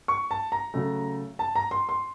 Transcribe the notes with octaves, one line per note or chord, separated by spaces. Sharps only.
C#6
A5
A#5
C#3 F#3 A3
A5
A#5
C6
C6